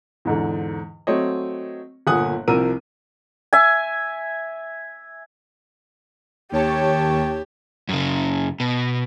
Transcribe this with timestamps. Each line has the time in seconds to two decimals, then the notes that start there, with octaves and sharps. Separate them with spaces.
0.25 E2 G#2 D3
1.07 F#3 A3 C4 C#5 D#5
2.07 G1 A#2 F#5 G#5 D#6 F#6
2.48 C2 C3 F3 A#4 E6 D#7
3.53 E5 G#5
6.52 D#2 G4 C#5 A5
7.89 F#2 C#3
8.60 B2